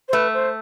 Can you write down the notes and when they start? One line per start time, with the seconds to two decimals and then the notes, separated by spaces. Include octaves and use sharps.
0.09 C5
0.13 A3 B4
0.34 C5